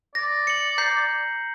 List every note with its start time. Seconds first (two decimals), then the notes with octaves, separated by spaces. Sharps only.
0.15 D5 A#6
0.47 C#7 F#7
0.78 A#5 G6 C7